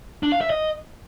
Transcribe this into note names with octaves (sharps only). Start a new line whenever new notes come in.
D4
F5
E5
D#5